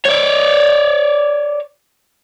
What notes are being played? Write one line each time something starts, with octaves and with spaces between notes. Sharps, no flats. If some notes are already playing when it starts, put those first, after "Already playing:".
C#5 D5